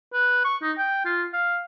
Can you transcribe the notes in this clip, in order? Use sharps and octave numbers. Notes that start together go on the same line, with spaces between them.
B4
C#6
D#4
G5
F4
F5